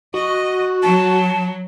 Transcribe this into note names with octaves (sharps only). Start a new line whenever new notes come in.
F#4 D#5
F#3 A5